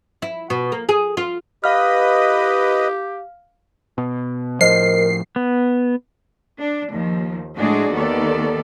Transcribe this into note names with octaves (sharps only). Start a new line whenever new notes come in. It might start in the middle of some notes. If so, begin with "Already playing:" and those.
E4
B2
A#3
G#4
F4
G4 B4 D#5 F5 F6
B2
A2 F3 A#4 C5 D#5 C7
B3
D4
D#2 F3
A2 G#3 D4 F#4 G#4 D5
D#2 D#3 B3 A4 D5